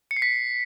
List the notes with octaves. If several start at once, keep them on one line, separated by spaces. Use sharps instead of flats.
C#7
C7
B6